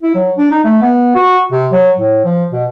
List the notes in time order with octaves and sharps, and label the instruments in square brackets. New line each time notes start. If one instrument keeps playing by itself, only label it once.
[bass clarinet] E4
F#3
D4
D#4
A3
B3
F#4
C3
F#3
A2
F3
B2